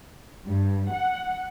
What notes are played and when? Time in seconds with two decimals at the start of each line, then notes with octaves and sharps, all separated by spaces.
0.47 G2
0.91 F#5